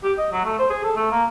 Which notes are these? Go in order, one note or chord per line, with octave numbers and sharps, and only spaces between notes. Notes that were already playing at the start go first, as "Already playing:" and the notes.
G4
D#5
F#3
A3
C5
G#4
A4
A3
A#3